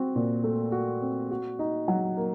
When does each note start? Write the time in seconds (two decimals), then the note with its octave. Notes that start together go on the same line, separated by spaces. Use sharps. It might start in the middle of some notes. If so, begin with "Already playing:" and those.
Already playing: C4 F#4
0.15 A#2
0.44 A3
0.72 F#4
1.02 C4
1.31 F#4
1.59 D#4
1.88 F#3
2.17 A#3